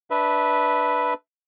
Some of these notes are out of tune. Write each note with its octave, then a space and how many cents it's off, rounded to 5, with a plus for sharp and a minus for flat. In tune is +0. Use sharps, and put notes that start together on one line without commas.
D4 +0 B4 +0 E5 -15